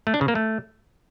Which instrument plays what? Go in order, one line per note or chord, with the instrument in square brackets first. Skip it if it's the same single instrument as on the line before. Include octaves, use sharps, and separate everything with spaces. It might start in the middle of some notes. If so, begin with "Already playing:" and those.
[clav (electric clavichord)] A3
D4
C#3
A#3
A3